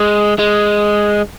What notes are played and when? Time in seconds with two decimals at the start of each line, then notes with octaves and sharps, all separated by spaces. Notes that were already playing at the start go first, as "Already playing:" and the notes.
Already playing: G#3
0.39 G#3